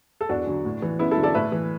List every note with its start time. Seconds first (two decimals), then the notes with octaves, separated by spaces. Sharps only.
0.21 A4
0.29 E2 D4 F#4
0.47 D3 F#3
0.65 A2
0.82 E3
0.99 F#2 B3 E4
1.11 E4 A4
1.17 D3 F#3
1.23 A4 D5
1.35 A2 B4 E5
1.52 E3